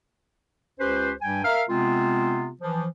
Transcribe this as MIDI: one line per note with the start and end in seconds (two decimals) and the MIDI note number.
0.79 1.12 37
0.79 1.12 61
0.79 1.12 67
0.79 1.12 71
0.79 1.12 72
1.21 1.44 43
1.21 1.44 55
1.21 1.44 79
1.21 1.44 80
1.44 1.63 70
1.44 1.63 76
1.44 1.63 77
1.69 2.50 48
1.69 2.50 56
1.69 2.50 59
1.69 2.50 60
1.69 2.50 65
2.60 2.86 52
2.60 2.86 53